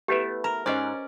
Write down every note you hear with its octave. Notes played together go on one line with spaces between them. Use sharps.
A3 B3 E4 G4 B4
A#4 A#5
G#2 C#4 C5 D5 D#5